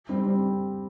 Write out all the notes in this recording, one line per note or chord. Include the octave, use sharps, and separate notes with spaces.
G3 C4
G3 C4